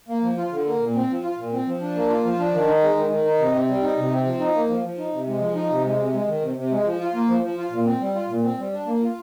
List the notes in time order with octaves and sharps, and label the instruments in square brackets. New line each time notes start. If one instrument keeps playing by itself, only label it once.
[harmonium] A#3
F3
F4
D3
A#3
A#2
C4
F3
F4
A#2
C4
F3
D4
A#3
F4
F3
D4
D#3
D#4
G#3
D#3
D#3
D#4
C3
C4
G3
D#4
C3
C4
F3
D#4
A#3
F3
F3
D#4
C3
G#3
F3
D#4
C3
G#3
C3
G#3
D#3
C3
C3
G#3
F3
F4
A#3
F3
F3
F4
A#2
C4
G3
F4
A#2
C4
G3
D4
A#3
F4